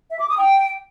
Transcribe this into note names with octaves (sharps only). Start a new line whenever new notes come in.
E5
D6
D#6
G5